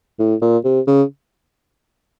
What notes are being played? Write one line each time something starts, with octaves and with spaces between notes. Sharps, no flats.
A2
A#2
C3
C#3